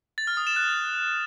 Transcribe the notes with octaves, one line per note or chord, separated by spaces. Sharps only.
A6
F6
D#6
E7
F#6